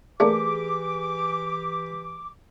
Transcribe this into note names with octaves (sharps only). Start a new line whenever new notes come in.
E3 A3 A#3 D4 G4 G#4 D6